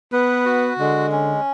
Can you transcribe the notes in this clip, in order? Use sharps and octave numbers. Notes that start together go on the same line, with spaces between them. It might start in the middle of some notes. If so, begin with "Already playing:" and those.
B3 B4
F#4
D3 G#3
C#4